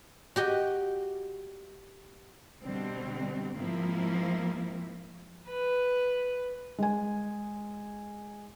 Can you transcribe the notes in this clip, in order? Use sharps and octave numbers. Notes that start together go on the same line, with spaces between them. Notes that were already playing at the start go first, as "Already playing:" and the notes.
F#4 G4 D#5
B2 D3 G3 C4
G#2 F3 A#3 C4 E4
B4
G#3 G#5